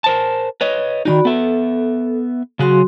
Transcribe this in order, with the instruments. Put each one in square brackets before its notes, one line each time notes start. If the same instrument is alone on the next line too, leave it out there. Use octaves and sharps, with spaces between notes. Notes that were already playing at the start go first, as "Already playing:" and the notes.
[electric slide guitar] A#4 C5 A5
B4 C#5 D#5
[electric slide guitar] D#3 F3 D#4 [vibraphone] F#4 D5 B5
[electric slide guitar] B3 E5 [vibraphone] A4
[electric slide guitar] C#3 G#4 [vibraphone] F#3 F#4 C6